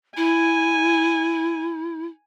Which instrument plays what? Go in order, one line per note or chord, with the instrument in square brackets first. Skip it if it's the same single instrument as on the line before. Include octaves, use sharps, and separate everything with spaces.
[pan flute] E4 [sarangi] G#5